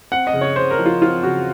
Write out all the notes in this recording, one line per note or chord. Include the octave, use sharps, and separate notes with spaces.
C4 F#5
D#5
C#3
C#5
C#3 C5
A#4
F3
F4
C4 F4
C#3 F#4